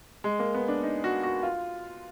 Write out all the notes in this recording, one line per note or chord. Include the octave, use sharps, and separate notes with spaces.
G#3
A#3
B3
D4
D#4
F#4
F#4
F4